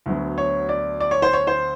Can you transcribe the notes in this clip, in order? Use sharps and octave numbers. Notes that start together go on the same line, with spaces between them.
D2 D3 F#3 B3
C#5
D5
D5
C#5
C5
C#5
C5